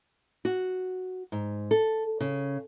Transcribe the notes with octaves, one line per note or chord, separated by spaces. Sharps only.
F#4
G#2
A4
C#3